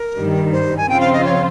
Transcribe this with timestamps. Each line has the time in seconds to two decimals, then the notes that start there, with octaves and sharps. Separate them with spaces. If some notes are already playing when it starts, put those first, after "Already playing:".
Already playing: A#4
0.17 G2 D#3 G3
0.52 C5
0.77 G#5
0.88 C#3 F3 C4 F4 G5
1.00 F5
1.13 D#5
1.24 C#5